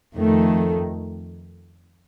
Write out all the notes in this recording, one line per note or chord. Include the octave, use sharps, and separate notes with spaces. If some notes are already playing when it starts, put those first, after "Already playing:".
F2 D#3 A3